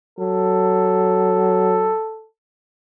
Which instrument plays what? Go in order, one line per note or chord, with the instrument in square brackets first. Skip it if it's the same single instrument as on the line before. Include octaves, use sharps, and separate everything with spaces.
[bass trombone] F#3 [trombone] A4